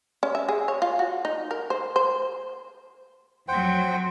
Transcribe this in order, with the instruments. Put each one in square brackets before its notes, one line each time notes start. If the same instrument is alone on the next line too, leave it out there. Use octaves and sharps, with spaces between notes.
[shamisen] C#4
E5
G#4
C#5
F4
F#4
D#4
A#4
C5
C5
[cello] F2 F#3 [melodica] C5 F#5 G5